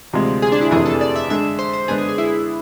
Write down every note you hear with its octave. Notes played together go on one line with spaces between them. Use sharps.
D2 C3 F3 G#3 C4
G#4
D4
E4
F2 C3 E3 A3 D4 G#4
A4
D5
E5
D3 G#3 D4 A4 E5
C5
C5
D3 G#3 B3 D4 G#4
G#4
G#4
E4